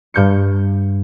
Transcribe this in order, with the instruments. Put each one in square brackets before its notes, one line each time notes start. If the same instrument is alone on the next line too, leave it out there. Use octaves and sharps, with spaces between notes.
[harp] G2 G6 C#7